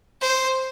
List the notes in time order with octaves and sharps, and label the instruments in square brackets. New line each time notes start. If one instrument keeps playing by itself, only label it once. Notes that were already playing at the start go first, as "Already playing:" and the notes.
[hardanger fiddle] C5